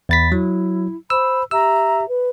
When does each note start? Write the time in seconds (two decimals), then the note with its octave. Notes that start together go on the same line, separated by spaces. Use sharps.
0.09 E2 B5 A6 B6
0.32 F#3 E4
1.10 C5 B5 E6
1.51 G4 E5 A#5 E6
2.08 B4